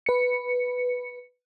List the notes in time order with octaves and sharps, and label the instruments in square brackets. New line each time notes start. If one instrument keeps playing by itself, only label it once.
[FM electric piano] B4 C#7